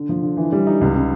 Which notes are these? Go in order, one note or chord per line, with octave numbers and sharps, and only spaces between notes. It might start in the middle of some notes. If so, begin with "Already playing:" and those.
Already playing: D3
F3
D3
E3
G3
D#4
C#2
C#3